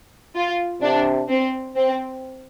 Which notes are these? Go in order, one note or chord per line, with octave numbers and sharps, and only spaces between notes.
F4
C3 D4
C4
C4